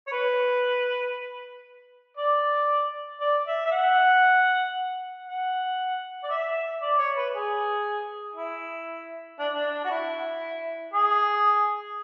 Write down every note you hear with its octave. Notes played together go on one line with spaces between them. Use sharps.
C#5
B4
D5
D5
E5
E5
F#5
F#5
D5
E5
D5
C#5
B4
G#4
E4
D4
D4
F#4
E4
G#4